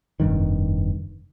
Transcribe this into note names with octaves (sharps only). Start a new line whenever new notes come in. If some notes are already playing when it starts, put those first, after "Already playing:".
F1 A#1 G2 D#3